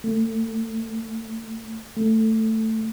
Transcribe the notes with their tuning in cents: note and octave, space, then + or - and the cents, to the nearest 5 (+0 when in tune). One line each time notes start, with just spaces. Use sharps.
A3 +30
A3 +10